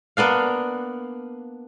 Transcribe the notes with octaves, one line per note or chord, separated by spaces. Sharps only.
A#3 B3 D4 F5